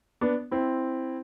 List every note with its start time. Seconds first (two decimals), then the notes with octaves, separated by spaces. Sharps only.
0.21 B3 D4
0.51 C4 E4